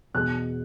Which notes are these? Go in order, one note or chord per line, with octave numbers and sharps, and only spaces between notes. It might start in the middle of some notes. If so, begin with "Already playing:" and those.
E2 B2 G#3 F#6